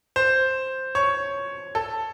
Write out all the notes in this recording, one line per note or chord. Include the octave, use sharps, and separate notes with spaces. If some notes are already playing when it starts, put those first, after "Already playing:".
C5
C#5
A4